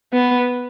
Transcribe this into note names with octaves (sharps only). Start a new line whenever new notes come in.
B3